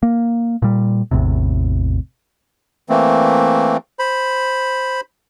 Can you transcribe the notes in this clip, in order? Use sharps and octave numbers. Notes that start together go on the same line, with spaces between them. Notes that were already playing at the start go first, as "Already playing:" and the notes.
A#3
A#2 G3
A1 E2 A2 C3
E3 A3 A#3 C4
C5 B5